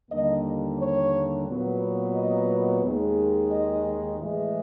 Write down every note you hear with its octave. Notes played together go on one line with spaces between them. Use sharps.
D#2 D3 G3 A#3 D#5
C#5
A#2 F#3 B3
D#5
D#2 D#3 G#3
D#5
A2 E3 G#3